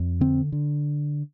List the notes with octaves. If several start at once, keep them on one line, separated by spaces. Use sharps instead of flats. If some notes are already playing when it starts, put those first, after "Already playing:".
Already playing: F2
D3 C4
D3